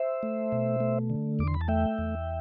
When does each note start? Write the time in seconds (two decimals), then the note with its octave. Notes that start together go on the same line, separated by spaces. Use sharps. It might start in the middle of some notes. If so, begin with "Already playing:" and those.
Already playing: C5 E5
0.23 A3
0.52 B2
0.80 A3
1.10 D3
1.39 E2 D6
1.48 C6
1.54 B5
1.61 A5
1.68 A3 E5 G5
1.98 E2